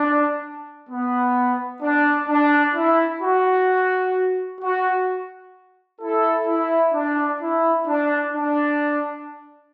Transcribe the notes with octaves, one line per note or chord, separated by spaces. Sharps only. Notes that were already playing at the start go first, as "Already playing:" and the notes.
Already playing: D4
B3
D4
D4
E4
F#4
F#4
E4 A4
E4
D4
E4
D4
D4